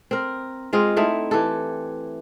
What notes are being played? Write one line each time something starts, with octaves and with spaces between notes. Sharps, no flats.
C4 A#4
G#3 C4 F4 D#5
A3 C4 D#4 E4
E3 G4 A4